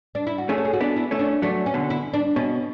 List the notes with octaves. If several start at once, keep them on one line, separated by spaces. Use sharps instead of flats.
D4
E4
F#4
A3 C#4 G#4
A4
G#4
F#4
B3 D4
E4
A3 C#4
D4
F#3 A3 D4
C#4
B2 D3
E4
D4
B2 C#4